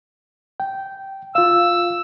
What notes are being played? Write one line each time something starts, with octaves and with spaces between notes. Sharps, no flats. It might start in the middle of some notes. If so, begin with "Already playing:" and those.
G5
F4 F5 E6